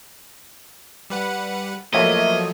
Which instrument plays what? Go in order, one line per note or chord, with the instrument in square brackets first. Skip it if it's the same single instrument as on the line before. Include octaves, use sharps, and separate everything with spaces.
[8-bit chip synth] G3 B4 F#5
[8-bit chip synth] F3 F#3 A3 [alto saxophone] A#3 [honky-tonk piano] C#5 E5 [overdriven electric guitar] D#5